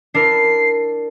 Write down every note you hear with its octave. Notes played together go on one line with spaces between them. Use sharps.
D4 E4 A#4 C7